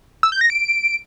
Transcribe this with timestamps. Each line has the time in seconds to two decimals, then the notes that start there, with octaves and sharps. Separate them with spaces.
0.23 E6
0.32 G6
0.41 A#6
0.50 D7